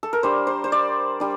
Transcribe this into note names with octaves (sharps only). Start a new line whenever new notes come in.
A4
A#4
G3 D4 C5
C5
C5
D5
G3 D4